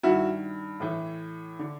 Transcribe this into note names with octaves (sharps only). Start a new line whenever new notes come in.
G2 D#3 E4 F#4
A2 E3
D3